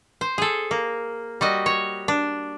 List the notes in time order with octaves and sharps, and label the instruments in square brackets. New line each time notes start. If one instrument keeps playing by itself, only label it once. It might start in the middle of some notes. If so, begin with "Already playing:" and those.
[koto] C5
G#4 A4
A#3
G3 F#4 D#5
C#5
D4